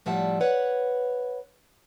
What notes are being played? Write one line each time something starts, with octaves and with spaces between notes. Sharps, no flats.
A2 F3 G3 E5 F#5 A5
B4 C#5 F#5